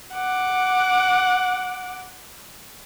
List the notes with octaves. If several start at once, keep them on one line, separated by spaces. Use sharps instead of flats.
F#5 D6